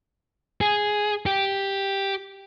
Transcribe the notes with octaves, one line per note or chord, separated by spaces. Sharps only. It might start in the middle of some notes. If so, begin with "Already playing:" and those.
G#4
G4